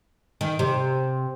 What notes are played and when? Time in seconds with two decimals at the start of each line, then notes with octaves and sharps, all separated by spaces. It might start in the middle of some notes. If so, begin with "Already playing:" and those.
0.41 D#3
0.59 C3